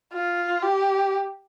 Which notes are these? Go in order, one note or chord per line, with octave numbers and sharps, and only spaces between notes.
F4
G4